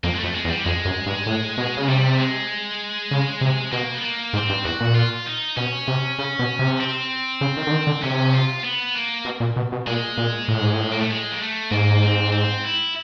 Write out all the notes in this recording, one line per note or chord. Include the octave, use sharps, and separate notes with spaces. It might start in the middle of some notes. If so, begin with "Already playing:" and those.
F2 A#3
G#3
F2 A3
G#3
E2
G3
F2 G#3
F#2
G2
A2
B2
C#3
C3 G3
G#3
C#3
C3
B2 A#3
B3
A#3
G#2 C4
G2
E2 F#4
A#2
F4
D#4
B2 C#4
C3
C#3
B2
C3
C4
C#3
D#3
D3
D#3
D3
C3 C#4
F4
B3
A#3
B2
A#2
B2
B2
A#2 G#3
A#2
A2
G#2
A2
A#3
A3
G#3
A#3
A3
G#2 A#3
C4
C4
E4